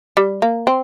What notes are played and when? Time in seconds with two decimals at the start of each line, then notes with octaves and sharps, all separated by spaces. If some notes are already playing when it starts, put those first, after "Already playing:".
0.17 G3
0.42 A#3
0.67 C4